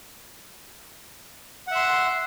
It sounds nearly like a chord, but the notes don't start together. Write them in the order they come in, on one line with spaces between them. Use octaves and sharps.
F#5 E5 C6